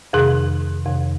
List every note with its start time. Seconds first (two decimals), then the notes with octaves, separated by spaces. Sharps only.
0.13 F2 C3 D#3 G#4
0.86 F2 C3 D#3